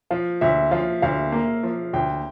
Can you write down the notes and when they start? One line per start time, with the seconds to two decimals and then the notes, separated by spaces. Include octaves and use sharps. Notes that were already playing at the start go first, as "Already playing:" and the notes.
0.11 F3 F5
0.41 D2 E5
0.71 F3 F5
1.02 D2 F5
1.32 A#3
1.63 F3
1.93 D2 G5